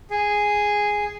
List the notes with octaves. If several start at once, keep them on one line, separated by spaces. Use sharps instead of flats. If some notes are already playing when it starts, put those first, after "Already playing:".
G#4